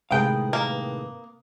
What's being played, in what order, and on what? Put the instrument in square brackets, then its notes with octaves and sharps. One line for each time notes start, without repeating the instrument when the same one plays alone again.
[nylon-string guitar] A2 D#3 G#3 [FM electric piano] C3 B4 D#6 [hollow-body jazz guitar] F5 G5
[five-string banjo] A#3